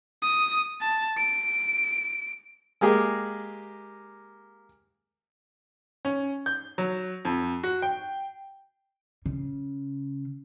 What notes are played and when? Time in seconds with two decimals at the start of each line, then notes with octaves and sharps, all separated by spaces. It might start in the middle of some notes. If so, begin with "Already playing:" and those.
0.22 D#6
0.81 A5
1.18 D7
2.81 G#3 A#3 G4 G#4
6.05 C#4
6.46 G6
6.78 F#3
7.25 F2
7.64 F#4
7.82 G5
9.26 C#3